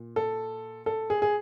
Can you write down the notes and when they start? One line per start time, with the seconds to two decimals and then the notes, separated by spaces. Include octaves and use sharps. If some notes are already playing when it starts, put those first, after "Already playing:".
Already playing: A#2
0.16 A4
0.86 A4
1.10 G#4
1.22 G#4